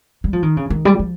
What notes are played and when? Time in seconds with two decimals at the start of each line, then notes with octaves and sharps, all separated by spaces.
0.24 G3
0.33 F3
0.43 D#3
0.57 C#3
0.70 D#3
0.85 G3
0.99 F3